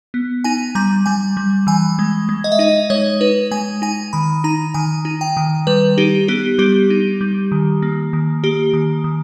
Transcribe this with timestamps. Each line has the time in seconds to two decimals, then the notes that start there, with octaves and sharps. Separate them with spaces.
0.14 B3
0.44 D#4 G#5
0.75 G3 A#5
1.06 G3 G#5
1.37 G3
1.67 E3 G#5
1.99 G#3
2.29 G#3
2.44 D#5
2.52 E5
2.59 D#4 D#5
2.90 G#3 C#5
3.21 D#4 B4
3.51 G#3 G#5
3.82 D#4 G#5
4.13 D#3 B5
4.44 D#4 A#5
4.74 D#3 G#5
5.05 D#4
5.21 G5
5.37 D#3
5.67 G3 B4
5.98 D#4 G4
6.28 B3 G4
6.58 G3 G4
6.90 D#4
7.21 G3
7.52 D#3
7.82 A#3
8.13 D#3
8.43 A#3 G4
8.73 D#3
9.04 D#3